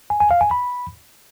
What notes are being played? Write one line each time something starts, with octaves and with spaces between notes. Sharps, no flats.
G#5
G#5
F5
G#5
B5